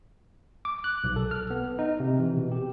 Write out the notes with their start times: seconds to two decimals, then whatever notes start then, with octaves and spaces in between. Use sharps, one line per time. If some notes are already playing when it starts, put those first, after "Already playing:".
0.65 D6
0.84 F#6
1.04 B1
1.16 A4
1.31 F6
1.50 B3
1.79 D#4
2.00 C3
2.19 E3
2.37 B2
2.52 G4